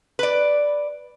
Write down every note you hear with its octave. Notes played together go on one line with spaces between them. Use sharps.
B4 D5